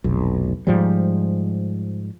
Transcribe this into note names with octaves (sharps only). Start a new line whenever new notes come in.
F1 B1
G#2 F3 G3